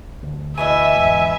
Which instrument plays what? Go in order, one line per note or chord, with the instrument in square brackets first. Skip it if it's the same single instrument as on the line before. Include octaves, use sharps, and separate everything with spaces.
[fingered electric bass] D2
[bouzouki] B2 E3 D#5 [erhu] E5 [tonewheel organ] G#5
[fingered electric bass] E2 G#2